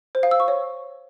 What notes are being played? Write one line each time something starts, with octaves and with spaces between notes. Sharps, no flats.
C5
F5
E6
C#6
C#5